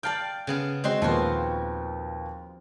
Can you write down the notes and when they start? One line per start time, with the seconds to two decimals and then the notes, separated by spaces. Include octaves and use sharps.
0.03 D5 F5 G5 A5 F6
0.47 C#3 B3 G#4
0.84 G#3 C4 F#4 D#5 C6
1.02 D#2 A#2 F3 B3 F4 F#4